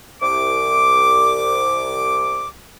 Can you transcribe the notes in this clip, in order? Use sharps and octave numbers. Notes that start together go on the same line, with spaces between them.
C2 D6